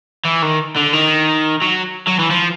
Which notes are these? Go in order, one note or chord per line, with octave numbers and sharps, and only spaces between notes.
E3
D#3
D3
D#3
F#3
F#3
E3
F3